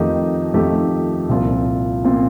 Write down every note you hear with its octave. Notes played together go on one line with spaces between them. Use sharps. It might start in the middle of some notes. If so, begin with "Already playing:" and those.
Already playing: F2 D#3 A3 D#4 G4
F2 D#3 A3 D#4 G4
C2 A#2 F3 C4 F4
A#2 F3 C4 F4